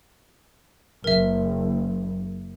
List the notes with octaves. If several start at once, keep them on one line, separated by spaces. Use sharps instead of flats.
F#1 A#4 E5